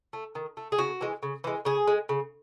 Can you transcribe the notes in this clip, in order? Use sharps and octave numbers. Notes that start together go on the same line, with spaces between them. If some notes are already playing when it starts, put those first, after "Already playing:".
A3
D#3
A3
G#4
C#3 F#4
E3 G#3
C#3
E3 G#3
C#3 G#4
G#3
C#3